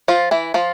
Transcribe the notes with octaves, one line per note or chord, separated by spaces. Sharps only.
F3 F4
E3 E4
F3 F4